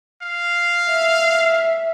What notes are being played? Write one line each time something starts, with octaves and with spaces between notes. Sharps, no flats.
F5
E5